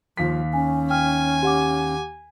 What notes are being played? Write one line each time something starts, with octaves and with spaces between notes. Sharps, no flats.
D#2 F3 F5 B6
C#4 G#5
G5 G#5 F6
G4 F#5 D6